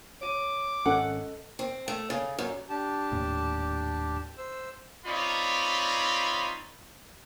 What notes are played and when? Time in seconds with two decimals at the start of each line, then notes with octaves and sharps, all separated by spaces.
0.21 C#5 D6 D#7
0.86 G#1 C#4 A4 D#5 F#5 F#6
1.59 C4
1.88 A3
2.10 C#3
2.39 F#2
2.69 D4 G4 A5
3.12 D#1 D#2 A2
4.38 C5 E6
5.06 C4 D#4 F4 C#5 D5 B5